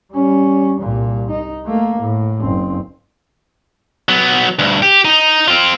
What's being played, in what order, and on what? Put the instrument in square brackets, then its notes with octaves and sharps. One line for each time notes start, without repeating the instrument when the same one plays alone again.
[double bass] G3 C#4
C2 A#2
D#4
A3 A#3
A2
F#1 C4
[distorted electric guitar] F#3 B3
D2 G2
G4
D#4
C4 F4